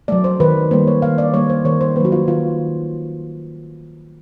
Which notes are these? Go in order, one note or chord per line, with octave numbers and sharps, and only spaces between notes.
F#3 A3 D5
C5
D#3 B4
G3 A#3 C5
C#5
D#3 F5
D5
G3 A#3 C#5
C5
D#3 C#5
C5
F#3 A#3 F#4 B4
F4
D#3 F4